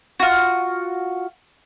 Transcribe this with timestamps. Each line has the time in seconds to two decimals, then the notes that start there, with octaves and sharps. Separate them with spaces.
0.20 F4 F#4